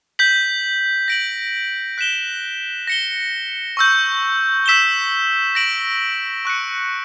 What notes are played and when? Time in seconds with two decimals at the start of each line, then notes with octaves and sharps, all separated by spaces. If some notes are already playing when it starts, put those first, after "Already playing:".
0.19 G6 B6 F#7
1.08 A#6 D7 F#7
1.98 F#6 B6 E7 G7
2.87 A#6 C#7 G7
3.77 C#6 E6 G6
4.66 E6 B6 E7 G7
5.55 A#6 D7 F#7
6.45 C#6 F#6 C#7